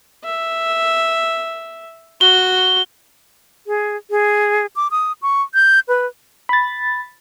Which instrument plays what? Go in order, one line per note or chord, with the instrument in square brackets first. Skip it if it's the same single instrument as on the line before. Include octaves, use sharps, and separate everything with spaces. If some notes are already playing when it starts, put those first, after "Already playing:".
[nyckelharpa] E5
[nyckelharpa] F#4 C#6 [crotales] G7
[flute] G#4
G#4
D6
D#6
C#6
G6
B4
[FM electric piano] B5 A6